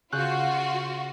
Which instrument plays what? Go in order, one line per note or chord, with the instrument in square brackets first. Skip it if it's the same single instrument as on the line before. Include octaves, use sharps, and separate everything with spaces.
[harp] C#3 F#6 G6 [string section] F4 F#4